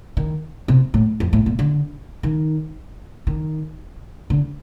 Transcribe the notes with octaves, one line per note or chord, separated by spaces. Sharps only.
D#3
C3
A2
F2
A2
A#2
D3
D#3
D#3
D3